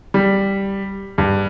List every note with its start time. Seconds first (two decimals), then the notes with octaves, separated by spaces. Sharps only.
0.14 G3
1.18 G2